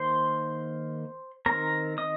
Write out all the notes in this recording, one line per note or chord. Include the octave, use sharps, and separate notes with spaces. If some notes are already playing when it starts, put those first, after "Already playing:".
Already playing: D#3 A#3 C5 C6
D#3 C4 A#4 A#5
D#5 D#6